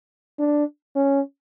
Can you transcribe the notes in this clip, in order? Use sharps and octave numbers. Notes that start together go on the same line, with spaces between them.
D4
C#4